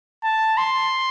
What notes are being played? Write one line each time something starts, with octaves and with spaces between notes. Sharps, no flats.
A5
C6